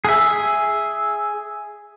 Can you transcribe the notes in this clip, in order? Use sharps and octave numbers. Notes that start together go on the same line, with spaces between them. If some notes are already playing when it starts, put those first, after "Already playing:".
G#4 E5